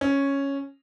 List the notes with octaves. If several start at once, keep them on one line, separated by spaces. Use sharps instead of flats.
C#4